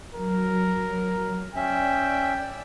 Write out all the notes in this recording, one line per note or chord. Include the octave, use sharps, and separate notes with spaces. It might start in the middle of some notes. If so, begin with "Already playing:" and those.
F#3 A#4
C#4 D5 E5 G5 E6